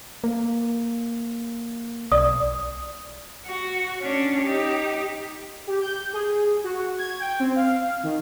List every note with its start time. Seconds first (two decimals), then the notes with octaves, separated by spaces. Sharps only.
0.24 A#3
2.12 B1 D5 D#6
3.46 F#4
4.00 C#4 D4
4.41 D#4 G4
5.67 G4
5.81 G6
6.13 G#4
6.64 F#4
6.98 G#6
7.19 G5
7.40 C4
7.56 F5
8.03 D#3